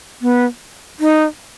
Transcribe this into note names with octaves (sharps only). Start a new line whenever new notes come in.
B3
D#4